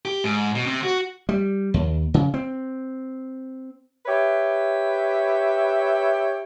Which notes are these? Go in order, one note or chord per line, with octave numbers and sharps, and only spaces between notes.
G4
G#2
B2
C3
F#4
G3
D#2
C#3
C4
G4 B4 C#5 E5